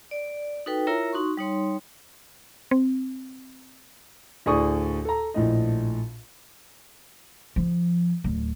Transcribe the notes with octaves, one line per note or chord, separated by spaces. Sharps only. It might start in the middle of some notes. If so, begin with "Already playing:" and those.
D5
D#4 F#4 A4 B4 G5
E4 F4 A#4 C#5 E5 A#5
D#4 F#4 C6 C#6
G3 D#4 C#5 C6
C4
D2 A2 G#4 D5 C#6 D#6
A4 A#5
A#1 A2 D#5
F3
D1